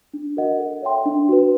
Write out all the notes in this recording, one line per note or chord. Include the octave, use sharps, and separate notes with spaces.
D4
F#4 A#4 D#5 F#5
A4
C#5 E5 G5 C6
D4
F#4 B4